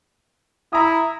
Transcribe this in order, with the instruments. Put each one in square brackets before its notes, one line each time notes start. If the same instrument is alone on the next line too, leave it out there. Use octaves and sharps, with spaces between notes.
[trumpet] E4 [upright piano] A#5 D#6